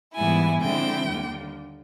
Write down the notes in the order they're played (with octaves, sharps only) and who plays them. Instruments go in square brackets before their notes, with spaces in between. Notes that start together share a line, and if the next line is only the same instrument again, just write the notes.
[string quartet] G#2 E3 G3 B3 E4 G#5
D3 F3 G#3 C4 E4 G5
D#2 D3 G3 A#3